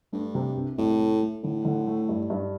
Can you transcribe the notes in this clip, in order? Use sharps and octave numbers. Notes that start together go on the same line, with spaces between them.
G2 A3
C3
C2
C2 A2
A3
A3
A2 D3
D3
A3
G2
G2